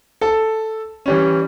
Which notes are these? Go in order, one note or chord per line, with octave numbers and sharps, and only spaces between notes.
A4 A5
E3 G3 C#4